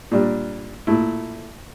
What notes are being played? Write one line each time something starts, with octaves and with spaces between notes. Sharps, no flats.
A#2 G3 D4
A#2 A3 E4